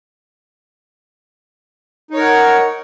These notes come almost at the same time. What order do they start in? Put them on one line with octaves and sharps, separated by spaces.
D#4 C#5 A#4 F#5